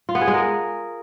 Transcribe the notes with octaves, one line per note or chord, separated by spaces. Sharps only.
F4
B3
G#4
G#3
A#4